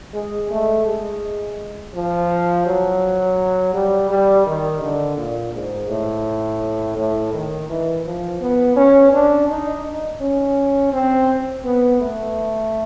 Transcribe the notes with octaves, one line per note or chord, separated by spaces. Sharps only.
G#3
A3
G#3
F3
F#3
G3
G3
D#3
D3
A#2
G#2
A2
A2
D#3
E3
F3
B3
C#4
D4
D#4
C#4
C4
B3
A3